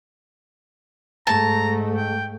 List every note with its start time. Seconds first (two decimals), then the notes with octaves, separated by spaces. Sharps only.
1.27 G#2 A3 A5 A#5
1.97 G5